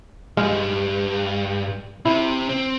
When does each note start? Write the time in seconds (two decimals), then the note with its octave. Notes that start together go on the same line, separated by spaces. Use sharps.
0.37 B1 G2 G#3 F5
2.06 C3 E4
2.49 C4